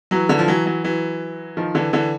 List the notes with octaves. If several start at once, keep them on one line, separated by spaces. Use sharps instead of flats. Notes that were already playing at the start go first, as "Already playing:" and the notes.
E3 F#3
D3 E3
F3
E3 F#3
E3 F#3
E3 F#3
D#3 F3
D3 E3
D3 E3